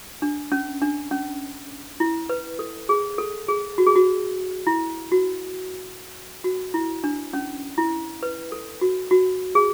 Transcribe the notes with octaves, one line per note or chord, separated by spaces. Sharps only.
D4
C#4
D4
C#4
E4
B4
A4
G#4
A4
G#4
F#4
G#4
F#4
E4
F#4
F#4
E4
D4
C#4
E4
B4
A4
F#4
F#4
G#4